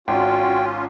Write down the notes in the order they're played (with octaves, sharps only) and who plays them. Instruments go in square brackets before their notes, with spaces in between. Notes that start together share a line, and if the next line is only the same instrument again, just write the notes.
[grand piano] G#1 [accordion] C#4 F4 [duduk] F#4 [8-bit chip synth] G5